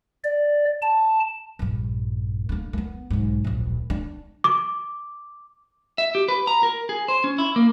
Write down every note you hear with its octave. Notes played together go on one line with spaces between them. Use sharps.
D5
A5
A#1 G2
D3 A#3
A#3 B3
B1 G#2
D1 A#1
D4
D6
E5
G4
B4
A#5
A#4
G#4
C5
C#4
E4
A#3